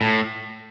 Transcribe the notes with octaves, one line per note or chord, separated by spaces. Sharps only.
A2